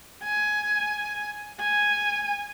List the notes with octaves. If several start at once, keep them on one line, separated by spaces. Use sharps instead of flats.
G#5
G#5